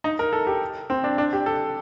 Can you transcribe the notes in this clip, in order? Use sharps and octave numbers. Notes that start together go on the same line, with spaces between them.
D#4
A#4
A4
G4
C4
D4
D4
G4
A4